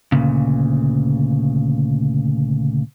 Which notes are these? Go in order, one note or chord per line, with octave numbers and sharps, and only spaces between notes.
D2 A#2 C#3